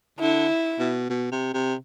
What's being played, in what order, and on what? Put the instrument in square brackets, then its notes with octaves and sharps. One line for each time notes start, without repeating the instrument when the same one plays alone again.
[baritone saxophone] D3 [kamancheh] E4
[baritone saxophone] B2
B2
C3
C3